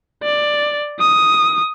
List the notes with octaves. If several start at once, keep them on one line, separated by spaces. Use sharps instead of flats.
D5
D#6